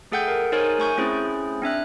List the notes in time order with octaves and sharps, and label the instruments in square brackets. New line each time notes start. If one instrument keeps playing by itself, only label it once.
[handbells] A3 G#4 A4 F#5 G5 G6
A#4
D#4 G#4 A#4 C5 C#5 G#5
A3 G#5 C#6 G6
A3 C4 C#4 E4 G#4 C5
C4 D4 E5 F#6